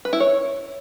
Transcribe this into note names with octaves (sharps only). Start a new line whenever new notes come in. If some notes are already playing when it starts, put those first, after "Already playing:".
B4
E4
C#5